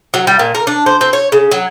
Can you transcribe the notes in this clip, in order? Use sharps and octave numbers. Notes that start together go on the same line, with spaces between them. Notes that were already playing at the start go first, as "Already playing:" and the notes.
F#3
G3
A#2
A#4
D4
C5
C4
C#5
C#3
F#3